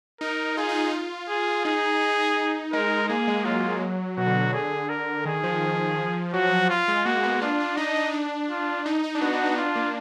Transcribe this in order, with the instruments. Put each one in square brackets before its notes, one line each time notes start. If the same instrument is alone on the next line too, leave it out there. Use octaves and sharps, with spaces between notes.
[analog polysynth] D#4 [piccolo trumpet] A#4
[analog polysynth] F4 [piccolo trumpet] G#4
[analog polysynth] D#4
F4
[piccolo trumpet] G#4
[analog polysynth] D#4 [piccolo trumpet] G#4
[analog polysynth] D#4
D#4
[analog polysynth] G#3 [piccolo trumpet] A#4
[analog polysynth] A#3 [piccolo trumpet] G#4
[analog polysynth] G#3
[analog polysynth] F#3 [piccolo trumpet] F4
[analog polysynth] B2 [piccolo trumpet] F#4
[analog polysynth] D3
B2
[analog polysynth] D3 [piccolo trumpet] G#4
[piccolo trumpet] A#4
[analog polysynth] D#3 [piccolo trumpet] G#4
[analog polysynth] F3
[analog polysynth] F#3 [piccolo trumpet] F#4
[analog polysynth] F#3
[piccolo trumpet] F4
[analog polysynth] G#3
[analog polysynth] A#3 [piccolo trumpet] F#4
[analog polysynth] B3
[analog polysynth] D4 [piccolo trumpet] F4
[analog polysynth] D4
[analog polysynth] D#4 [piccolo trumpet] D#5
[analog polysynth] D#4
D4
[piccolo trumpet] F4
[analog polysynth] D#4
D#4
D4
[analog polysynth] B3 [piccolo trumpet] F#4
[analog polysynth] D4
D#4
[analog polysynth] D4 [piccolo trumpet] F4
[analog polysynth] A#3